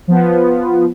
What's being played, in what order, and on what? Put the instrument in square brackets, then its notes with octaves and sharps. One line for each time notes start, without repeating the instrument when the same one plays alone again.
[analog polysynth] F3 B3